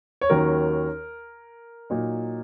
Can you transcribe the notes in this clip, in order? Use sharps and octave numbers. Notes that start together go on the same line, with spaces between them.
C#5
D#2 D#3 F#3 C#4 A#4
A#2 F#3 D#4